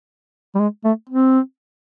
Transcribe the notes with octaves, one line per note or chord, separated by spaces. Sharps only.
G3
G#3
A3
C4